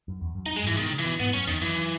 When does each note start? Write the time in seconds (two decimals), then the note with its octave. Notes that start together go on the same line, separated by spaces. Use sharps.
0.08 F#2
0.21 E2
0.35 F#2
0.46 D#4
0.49 F#2
0.56 G#3
0.64 G#2 E3
0.77 B2 D#3
0.92 C#3
0.99 E3
1.05 B2
1.20 G#2 B3
1.33 F#2 C#4
1.47 E2 D#3
1.61 F#2 E3